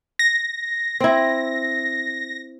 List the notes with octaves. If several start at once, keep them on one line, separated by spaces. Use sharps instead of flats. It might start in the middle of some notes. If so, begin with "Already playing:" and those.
A#6
C4 E4